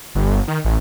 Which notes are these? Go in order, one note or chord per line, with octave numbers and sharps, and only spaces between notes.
G1
D#3
A1